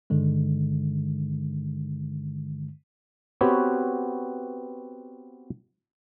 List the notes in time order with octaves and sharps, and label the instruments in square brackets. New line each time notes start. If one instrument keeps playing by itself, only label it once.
[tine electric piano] G2 D3 D#3 G#3
[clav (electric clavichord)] B3 C4 F#4 G4 B4 C#5